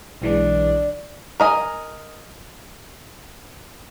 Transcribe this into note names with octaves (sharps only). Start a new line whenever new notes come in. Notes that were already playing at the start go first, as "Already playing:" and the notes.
B1 E3 G#3 D4
A#4 D#5 G#5